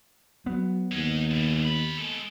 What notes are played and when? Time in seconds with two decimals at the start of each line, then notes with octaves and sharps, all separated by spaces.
0.46 F#3 B3
0.92 D#2 G#3 D#4
1.31 F#2 B2
1.62 A#2 B5
1.98 G#3 A4